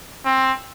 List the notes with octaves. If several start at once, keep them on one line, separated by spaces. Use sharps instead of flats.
C4